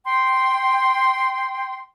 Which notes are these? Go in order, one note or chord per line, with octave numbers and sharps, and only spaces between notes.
G5 C6